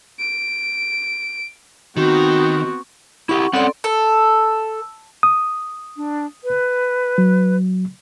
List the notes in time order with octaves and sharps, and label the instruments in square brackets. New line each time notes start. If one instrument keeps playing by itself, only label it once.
[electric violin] D7
[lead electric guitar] D#3 [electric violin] B3 C4 [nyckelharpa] F#4
[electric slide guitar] E4 G4 [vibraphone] F#5 C#6
[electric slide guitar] C4 C#4 F#5 [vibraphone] A4 D5 C6
[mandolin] A4
[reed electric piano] D#6
[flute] D4
B4
[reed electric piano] F#3